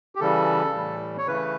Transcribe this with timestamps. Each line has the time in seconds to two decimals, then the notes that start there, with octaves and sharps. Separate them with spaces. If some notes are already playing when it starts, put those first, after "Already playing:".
0.15 G4
0.20 C#3 E3 G3 A4
0.73 A2 E3 G3
1.18 C#5
1.27 C#3 E3 A3 B4